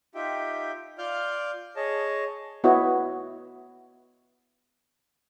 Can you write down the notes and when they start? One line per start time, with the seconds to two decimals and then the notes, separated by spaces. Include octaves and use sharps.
0.15 D#4 F4 G4 E5 G5
0.98 F4 D5 F5 F6 G6
1.76 G#4 C#5 D#5 A5
2.64 B3 E4 F#4 C#5 D#5